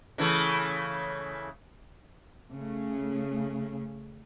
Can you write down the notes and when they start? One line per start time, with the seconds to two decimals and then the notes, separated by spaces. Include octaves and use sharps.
0.18 C#3 E3 A3
2.53 C#3 A3